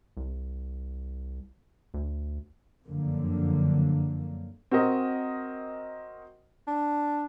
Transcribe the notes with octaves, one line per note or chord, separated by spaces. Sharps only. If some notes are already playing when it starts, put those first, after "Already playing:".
C2
D2
F#1 F2 D3 F#3 A#3
C4 F#4 A#4 D#5
D4